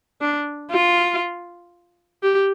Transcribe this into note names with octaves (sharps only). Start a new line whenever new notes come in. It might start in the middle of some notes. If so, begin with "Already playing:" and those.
D4
F4
G4